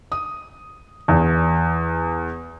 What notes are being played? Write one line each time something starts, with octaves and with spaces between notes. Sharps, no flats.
D#6
E2